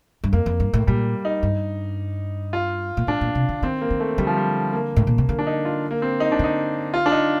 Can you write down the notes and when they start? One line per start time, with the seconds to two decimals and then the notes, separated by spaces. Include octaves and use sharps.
0.24 G2
0.33 F2 A#3
0.46 F2
0.60 G2
0.74 A2
0.87 A#2 G3
1.25 D#4
1.43 G2
2.53 F4
2.97 A#2
3.07 A2 D4
3.21 A#2
3.35 C3
3.49 D3
3.62 D#3 C4
3.81 A#3
3.90 D#3
4.00 A3
4.18 D3 G3
4.27 F3
4.37 G3
4.73 A#3
4.96 A2
5.07 A#2
5.18 C3
5.29 D3 A#3
5.39 D4
5.47 D#4
5.65 F4
5.91 A#3
6.02 C4
6.20 D#4
6.32 D4
6.39 D3 D#4
6.94 F4
7.06 D4
7.12 D#4